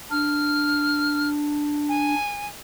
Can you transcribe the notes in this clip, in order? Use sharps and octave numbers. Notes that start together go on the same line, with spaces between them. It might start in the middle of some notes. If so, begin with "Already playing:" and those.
D4 F6
G#5